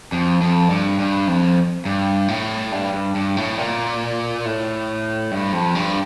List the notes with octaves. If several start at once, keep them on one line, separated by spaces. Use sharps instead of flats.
F2
F2
G2
G2
F2
G2
A2
G2
G2
G2
A2
A#2
A2
G2
F2
G2